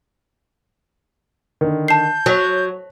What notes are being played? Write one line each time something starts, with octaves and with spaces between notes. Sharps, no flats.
D3 D#3
A5 G6 C7
F#3 F#6 B6 F7